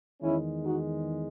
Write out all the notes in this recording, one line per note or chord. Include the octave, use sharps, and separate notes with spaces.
E2 D#3 G#3 C#4 E4
D#4 F#4